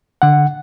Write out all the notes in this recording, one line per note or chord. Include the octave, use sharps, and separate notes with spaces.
D3 F#5